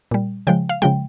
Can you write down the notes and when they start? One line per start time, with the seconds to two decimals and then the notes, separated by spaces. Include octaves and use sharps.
0.11 A#2 G3
0.47 C#3 F3 G#3 G5
0.69 F5
0.82 C#3 F3 G#3 G5